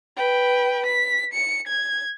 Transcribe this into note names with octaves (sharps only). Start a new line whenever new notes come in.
B4 G5
B6
C#7
G#6